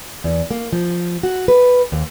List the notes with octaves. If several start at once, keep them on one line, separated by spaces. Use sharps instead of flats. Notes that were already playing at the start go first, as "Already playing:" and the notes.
E2
A#3
F3
F#4
B4
D#2